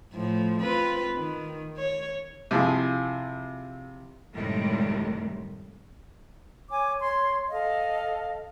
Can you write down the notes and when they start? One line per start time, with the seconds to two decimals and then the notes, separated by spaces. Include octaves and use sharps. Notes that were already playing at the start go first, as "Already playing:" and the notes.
0.13 A2 F3
0.60 C4 F4 B4
1.14 D#3
1.77 C#5
2.51 C3 F3 E4 F4 G#4
4.34 F#2 A2 C3 D#3 G3 G#3
6.69 C#5 G#5 D6
7.00 C#5 C6
7.51 A4 D#5 F5